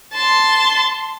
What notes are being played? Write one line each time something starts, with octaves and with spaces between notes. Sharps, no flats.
A5 C6